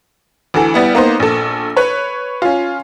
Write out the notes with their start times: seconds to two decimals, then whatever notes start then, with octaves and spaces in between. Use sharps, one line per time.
0.54 D2 E3 A4
0.74 G3 B3 E4
0.95 A#3 B3 D#4 C5
1.20 A#1 A4
1.77 B4 C#5
2.42 C#4 F4